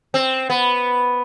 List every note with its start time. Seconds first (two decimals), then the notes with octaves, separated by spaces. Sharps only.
0.14 C4
0.50 B3